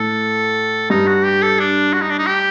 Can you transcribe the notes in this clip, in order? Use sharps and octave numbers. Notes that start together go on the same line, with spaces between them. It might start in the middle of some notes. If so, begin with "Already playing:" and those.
Already playing: A2 A4
G2 D#4
F#4
G4
A4
D4
F#4
D#4
D4
D#4
G4